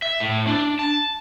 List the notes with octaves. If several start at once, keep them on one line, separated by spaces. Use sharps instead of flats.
E5
A2
D4
A5